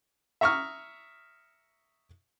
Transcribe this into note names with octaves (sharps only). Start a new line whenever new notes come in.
E5 A#5 C#6 D#6 F6